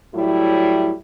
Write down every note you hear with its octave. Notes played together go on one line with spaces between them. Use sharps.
A2 F#3 G3 E4